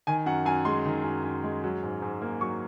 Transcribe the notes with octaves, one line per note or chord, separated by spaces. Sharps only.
D#3 G#5
F#2 F#5
F#2 G#5
G#3 C6
D#3
F#2
F#2
G#3
F#3
G#2
G#2
A#3
F#3 C#6